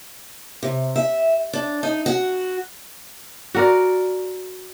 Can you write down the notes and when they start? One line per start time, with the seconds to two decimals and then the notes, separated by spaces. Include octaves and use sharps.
0.63 C3
0.96 E5
1.53 D4
1.83 D#4
2.06 F#4
3.55 F#4 A#4 D5